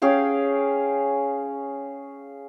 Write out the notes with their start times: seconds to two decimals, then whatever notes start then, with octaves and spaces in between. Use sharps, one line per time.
0.02 C#4 G#4 F5 G5